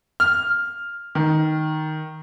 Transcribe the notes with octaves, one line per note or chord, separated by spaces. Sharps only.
F6
D#3